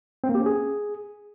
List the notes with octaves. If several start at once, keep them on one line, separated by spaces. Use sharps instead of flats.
C4
A#3
G4
C#4
G#4